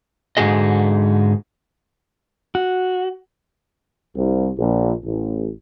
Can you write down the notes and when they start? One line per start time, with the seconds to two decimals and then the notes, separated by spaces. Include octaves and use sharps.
0.37 G#2 D3 F#4 G#4 D#5
2.55 F#4
4.15 C2
4.58 A#1
5.05 A1